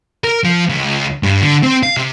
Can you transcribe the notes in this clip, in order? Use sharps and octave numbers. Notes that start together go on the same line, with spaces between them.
A#4
F3
C#2
G2
D3
C4
F5
C3